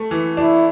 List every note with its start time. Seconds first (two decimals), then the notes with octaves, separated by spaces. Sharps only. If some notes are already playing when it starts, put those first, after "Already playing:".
Already playing: A3
0.11 E3
0.37 D4 E4